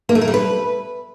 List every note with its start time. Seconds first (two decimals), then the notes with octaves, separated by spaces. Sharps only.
0.09 A#3
0.15 A3
0.21 A#4
0.28 G3
0.34 B4